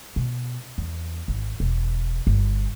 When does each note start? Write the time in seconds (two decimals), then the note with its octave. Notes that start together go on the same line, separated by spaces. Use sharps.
0.16 B2
0.78 E2
1.28 G#1
1.60 E1
2.27 G1